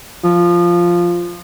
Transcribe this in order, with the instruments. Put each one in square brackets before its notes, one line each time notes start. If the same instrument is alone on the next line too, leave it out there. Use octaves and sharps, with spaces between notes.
[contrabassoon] F3